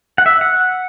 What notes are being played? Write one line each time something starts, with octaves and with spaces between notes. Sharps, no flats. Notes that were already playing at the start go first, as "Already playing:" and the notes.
F#5
E5
F#5